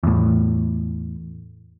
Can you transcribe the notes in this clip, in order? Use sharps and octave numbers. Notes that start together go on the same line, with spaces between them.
E2 A2